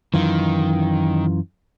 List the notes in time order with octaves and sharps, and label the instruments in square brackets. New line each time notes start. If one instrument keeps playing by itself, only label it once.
[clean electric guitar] F#2 E3 F4 [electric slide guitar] D#3